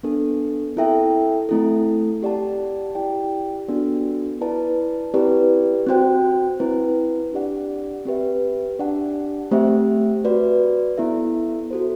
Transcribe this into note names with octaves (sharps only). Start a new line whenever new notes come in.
B3 D4 A4
C4 E4 A4 E5 G5
A3 C4 E4 A4
G4 D5 F#5 A5
E4 G4 D5 G5
B3 D4 F#4 A4 D5
E4 B4 D5 A5
C4 E4 G4 B4 D5
C4 F#4 C5 G5
C4 E4 B4
D4 G4 D5 F#5
C4 G4 B4 E5
D4 G4 D5 F#5 A5
A3 C4 G4 C5 E5
F#4 B4 D5
B3 E4 A4 E5
F#4 A4 C5